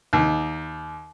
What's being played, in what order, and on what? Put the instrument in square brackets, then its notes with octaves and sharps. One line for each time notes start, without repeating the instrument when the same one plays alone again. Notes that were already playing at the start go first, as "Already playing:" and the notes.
[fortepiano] D#2